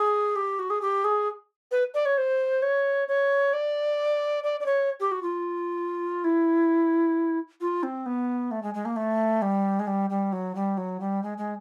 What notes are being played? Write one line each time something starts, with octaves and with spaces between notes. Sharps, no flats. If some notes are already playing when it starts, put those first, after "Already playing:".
Already playing: G#4
G4
F#4
G#4
G4
G#4
B4
D5
C#5
C5
C#5
C#5
D5
D5
D5
C#5
G4
F#4
F4
E4
F4
C4
B3
A3
G#3
G#3
A#3
A3
G3
G#3
G3
G3
F#3
G3
F#3
G3
G#3
G#3